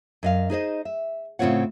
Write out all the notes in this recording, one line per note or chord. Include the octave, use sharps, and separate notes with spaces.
F#2 D#5 F5
D#4 G#4 C5 D#5
E5
A2 C#3 C4 F4 C#5 F#5